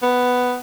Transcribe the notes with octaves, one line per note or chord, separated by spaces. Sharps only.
B3